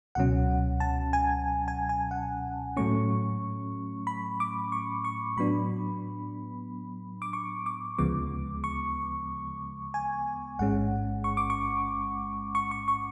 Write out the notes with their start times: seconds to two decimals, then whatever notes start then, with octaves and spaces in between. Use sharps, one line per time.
0.15 C#2 B2 F#3 C#4 F#5
0.80 A5
1.13 G#5
1.68 G#5
1.89 G#5
2.11 F#5
2.76 A2 F#3 A3 C#4 C#6
4.07 B5
4.40 D6
4.72 C#6
5.04 C#6
5.37 A2 F#3 B3 D4 B5
7.22 D6
7.33 C#6
7.66 D6
7.98 D2 C#3 F3 G#3 B3 D6
8.64 C#6
9.94 G#5
10.59 A1 G#2 G#3 C#4 F#5
11.24 C#6
11.37 D6
11.50 C#6
12.55 C#6
12.71 C#6
12.88 C#6